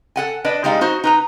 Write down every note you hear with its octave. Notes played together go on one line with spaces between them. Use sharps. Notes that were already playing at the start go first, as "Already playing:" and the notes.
A4 F#5 G#5
D4 B4 D#5
G3 G#3 D#4 F5
D#4 F#4 C5
D#4 B4 A#5